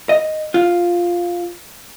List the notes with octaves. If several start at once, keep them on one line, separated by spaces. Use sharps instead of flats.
D#5
F4